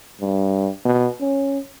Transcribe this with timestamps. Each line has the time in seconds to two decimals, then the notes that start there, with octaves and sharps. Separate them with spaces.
0.21 G2
0.85 B2
1.21 C#4